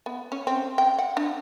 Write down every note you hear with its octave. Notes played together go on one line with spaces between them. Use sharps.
B3
C#4
C4
G5
F#5
D4